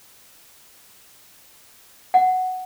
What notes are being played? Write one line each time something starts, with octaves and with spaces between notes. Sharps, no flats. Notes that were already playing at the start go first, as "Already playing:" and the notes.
F#5